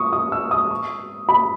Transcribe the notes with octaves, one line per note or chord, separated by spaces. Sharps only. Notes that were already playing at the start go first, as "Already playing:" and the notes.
Already playing: C#6 D#6
D#6
E6
D#6
C#6
B5